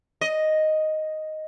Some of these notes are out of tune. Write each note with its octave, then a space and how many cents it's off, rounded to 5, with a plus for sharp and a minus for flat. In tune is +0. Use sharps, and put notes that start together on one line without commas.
D#5 +0